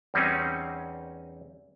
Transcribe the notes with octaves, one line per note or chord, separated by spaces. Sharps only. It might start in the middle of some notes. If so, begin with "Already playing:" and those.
E2 G3 C4 C#4 D#4